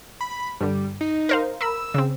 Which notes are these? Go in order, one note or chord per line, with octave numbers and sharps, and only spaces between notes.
B5
G2 D3 G3
D#4
A#4 C5 F5
A#4 B5 E6
C#3 C4